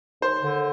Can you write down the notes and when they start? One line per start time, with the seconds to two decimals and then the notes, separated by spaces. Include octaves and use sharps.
0.22 D#2 C5
0.42 D3